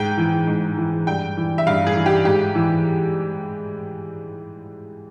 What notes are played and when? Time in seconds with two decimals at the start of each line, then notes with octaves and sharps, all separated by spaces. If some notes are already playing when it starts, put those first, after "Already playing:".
Already playing: G#2 G5
0.17 E3
0.48 G#2
0.77 E3
1.07 G2 G5
1.37 E3
1.58 E5
1.67 G2 F5
1.87 G#4
1.96 E3
2.06 G4
2.25 G#2 G4
2.55 E3